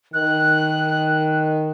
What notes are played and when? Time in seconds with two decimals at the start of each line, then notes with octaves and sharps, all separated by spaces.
0.14 D#3 F#6